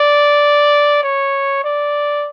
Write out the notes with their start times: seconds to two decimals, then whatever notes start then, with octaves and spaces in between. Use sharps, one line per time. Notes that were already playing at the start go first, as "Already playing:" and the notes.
Already playing: D5
1.03 C#5
1.64 D5